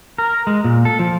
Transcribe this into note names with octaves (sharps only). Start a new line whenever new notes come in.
A#4
G#3
A#2
A4
F3